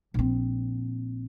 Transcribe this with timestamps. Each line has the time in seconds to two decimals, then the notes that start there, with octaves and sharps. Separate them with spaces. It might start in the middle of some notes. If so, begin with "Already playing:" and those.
0.14 A#1 C4